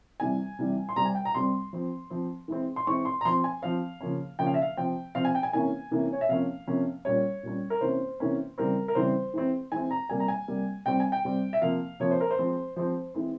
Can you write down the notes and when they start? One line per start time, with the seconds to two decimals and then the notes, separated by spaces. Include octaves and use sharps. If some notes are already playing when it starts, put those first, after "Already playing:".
0.20 C3 E3 G3 G#5
0.59 C3 E3 G3
0.89 C6
0.96 C3 G3 C4 A#5
1.05 G#5
1.15 G5
1.25 A#5
1.35 C3 G3 C4 C6
1.73 F3 C4
2.10 F3 C4
2.48 E3 G#3 C4
2.76 C6
2.87 E3 G#3 C4 C#6
3.05 C6
3.21 A#5
3.25 F3 C4 C6
3.44 G#5
3.62 F3 C4 F5
4.01 C#3 F3 A#3 C#4
4.39 C#3 F3 A#3 C#4 G5
4.46 F5
4.54 E5
4.62 F5
4.77 C3 F3 C4 G5
5.15 C3 F3 C4 F5
5.25 G#5
5.35 G5
5.43 G#5
5.53 C3 E3 A#3 C#4 G#5
5.91 C3 E3 A#3 C#4
6.13 C#5
6.21 E5
6.29 C3 F3 A#3 C#4 F5
6.67 C3 F3 A#3 C#4
7.05 A#2 G3 C#4 C#5
7.43 A#2 G3 C#4
7.70 A#4
7.81 C3 E3 A#3 C#4 C5
8.20 C3 E3 A#3 C#4
8.58 C#3 E3 G3 C4 A#4
8.88 A#4
8.95 C#3 E3 G3 C4 C5
9.34 E3 G#3 C4
9.72 E3 G#3 C4 G#5
9.91 A#5
10.09 C3 G3 A#3 G#5
10.20 A#5
10.28 G#5
10.48 C3 G3 A#3
10.86 C3 G3 C4 G5
11.00 G#5
11.12 G5
11.25 C3 G3 C4
11.53 E5
11.62 C3 F3 A#3 F5
12.00 C3 F3 A#3 C#5
12.11 C5
12.21 A#4
12.31 C5
12.38 F3 G#3 C4
12.76 F3 G#3 C4 C5
13.14 E3 G#3 C4